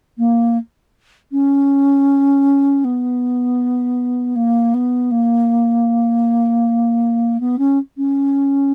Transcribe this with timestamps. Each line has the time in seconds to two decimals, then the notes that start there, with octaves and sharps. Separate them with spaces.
0.18 A#3
1.31 C#4
2.84 B3
4.35 A#3
4.74 B3
5.11 A#3
7.40 B3
7.58 C#4
7.97 C#4